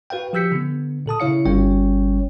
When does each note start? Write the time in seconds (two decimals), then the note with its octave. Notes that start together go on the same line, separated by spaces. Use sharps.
0.10 F#4 B4 F5 G5
0.33 F3 G4 E6 G6 B6 C#7
0.52 D3 B3
1.06 A#2 A4 A5 D#6
1.20 C#3 E4 C#5 F5 C#7
1.45 G1 G3 C#4 C#5 G5